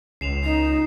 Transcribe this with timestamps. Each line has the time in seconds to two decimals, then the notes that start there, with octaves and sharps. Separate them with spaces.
0.21 C#2 C7 E7 F7
0.44 D#4